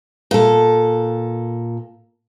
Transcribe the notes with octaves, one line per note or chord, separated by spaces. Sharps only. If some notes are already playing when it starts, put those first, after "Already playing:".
A#2 A4